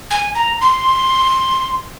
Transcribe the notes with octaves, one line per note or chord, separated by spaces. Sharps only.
G#5
A#5
C6